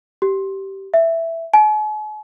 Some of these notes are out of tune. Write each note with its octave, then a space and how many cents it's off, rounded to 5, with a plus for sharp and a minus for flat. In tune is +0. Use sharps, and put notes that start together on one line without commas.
G4 -15
E5 +5
G#5 +45